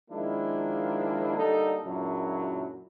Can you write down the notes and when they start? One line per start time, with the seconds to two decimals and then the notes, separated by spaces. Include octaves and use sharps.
0.10 D#3 F3 G#3 A#3 D4 E4
1.37 D3 G3 A#3 D#4 A4
1.84 C#2 F#2 A#2 F#3 D4 E4